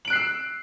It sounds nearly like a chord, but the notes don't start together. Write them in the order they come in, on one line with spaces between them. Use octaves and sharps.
F#7 D7 F#6 C7 E6